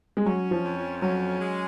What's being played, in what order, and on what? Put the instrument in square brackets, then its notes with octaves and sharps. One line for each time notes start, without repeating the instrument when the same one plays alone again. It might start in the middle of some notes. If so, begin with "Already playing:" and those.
[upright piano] G#3
[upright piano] F#3 [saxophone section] C#4
[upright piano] F3
[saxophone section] F2
[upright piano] F#3 [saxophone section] C#4
[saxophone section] G#3